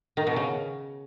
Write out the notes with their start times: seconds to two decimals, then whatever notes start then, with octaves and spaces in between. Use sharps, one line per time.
0.17 D#3
0.27 B2
0.36 C#3